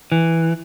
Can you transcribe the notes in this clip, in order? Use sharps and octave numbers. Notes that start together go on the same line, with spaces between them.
E3